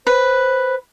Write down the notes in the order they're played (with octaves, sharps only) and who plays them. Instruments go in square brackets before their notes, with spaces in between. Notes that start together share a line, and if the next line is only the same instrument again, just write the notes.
[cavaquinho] B4 [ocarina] C5